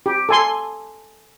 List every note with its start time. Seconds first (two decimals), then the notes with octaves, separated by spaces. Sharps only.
0.06 G4
0.29 A4 G#5 C6